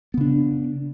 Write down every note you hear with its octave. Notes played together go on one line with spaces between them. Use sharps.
C#3 B3 D4